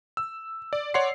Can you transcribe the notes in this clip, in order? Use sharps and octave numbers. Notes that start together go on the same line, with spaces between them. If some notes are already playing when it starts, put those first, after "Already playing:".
E6
D5
C#5 D5 F#5 C6 C7